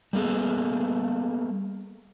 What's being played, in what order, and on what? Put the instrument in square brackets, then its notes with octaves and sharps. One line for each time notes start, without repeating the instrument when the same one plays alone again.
[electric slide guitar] G3 A#3 B3 G#4 A4